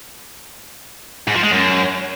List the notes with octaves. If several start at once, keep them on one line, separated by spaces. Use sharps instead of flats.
G#2
F3
G#3
F#2